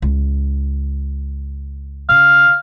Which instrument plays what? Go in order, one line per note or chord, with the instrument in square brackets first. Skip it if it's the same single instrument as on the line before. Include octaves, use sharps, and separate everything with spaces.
[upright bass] C#2
[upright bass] C#3 [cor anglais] F5